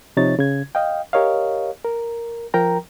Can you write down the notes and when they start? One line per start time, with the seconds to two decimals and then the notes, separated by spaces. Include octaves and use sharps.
0.17 C3 F3 D#4 C#5 A6
0.39 C#3 G#6
0.75 D#5 F5 G5
1.13 G4 A#4 C#5 D#5 F5
1.85 A#4
2.54 F3 A#4 G5 A#5